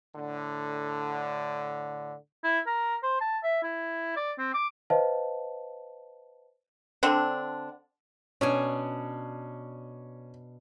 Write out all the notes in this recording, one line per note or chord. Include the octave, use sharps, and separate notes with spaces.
A2 D3
E4
A#4
C5
A5
E5
E4
D5
C4
D6
B4 C5 D#5 F5 A5
D3 C4 D4
B2 C#4 D4 G#5